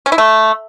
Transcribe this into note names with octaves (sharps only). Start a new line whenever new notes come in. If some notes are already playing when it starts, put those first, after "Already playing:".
C#4
E4
A3